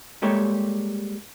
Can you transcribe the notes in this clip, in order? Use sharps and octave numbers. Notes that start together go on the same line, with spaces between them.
G3 G#3 A#3 G4 A4 C#5